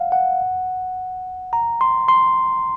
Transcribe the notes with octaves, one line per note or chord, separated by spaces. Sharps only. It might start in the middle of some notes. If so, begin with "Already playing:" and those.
Already playing: F5 F#5
F#5
A#5
C6
C6